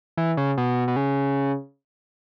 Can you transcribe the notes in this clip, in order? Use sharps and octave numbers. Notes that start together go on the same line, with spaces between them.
E3
C#3
B2
B2
C#3